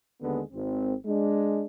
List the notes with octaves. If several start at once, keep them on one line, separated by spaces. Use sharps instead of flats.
D#2 D3 G#3 B3
G#1 C4
G#3 D4